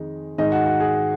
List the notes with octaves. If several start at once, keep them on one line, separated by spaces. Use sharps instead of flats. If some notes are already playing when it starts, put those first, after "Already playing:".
Already playing: F2 D#3 G#3 D#4
G#2 D#3 G#3 D#4 D#5
F#4
F#4
G#4